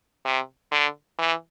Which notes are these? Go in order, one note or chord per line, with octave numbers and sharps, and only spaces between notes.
C3
D3
E3